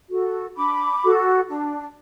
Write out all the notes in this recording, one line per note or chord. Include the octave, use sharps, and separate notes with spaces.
F#4 A4
D4 B5 D6
F#4 A4
D4